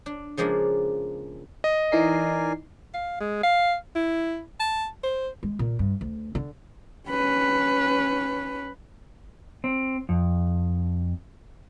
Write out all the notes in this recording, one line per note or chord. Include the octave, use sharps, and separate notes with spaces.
D4
C#3 F3 G#3 A#3 D4
D#5
E3 D#4 A#4 D5 G#5 C7
F5
G#3
F5
E4
A5
C5
G#3
A#2
G2
D2
D3
C#4 B4
C4
F2